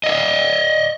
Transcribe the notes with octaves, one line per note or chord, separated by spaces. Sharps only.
D#5 E5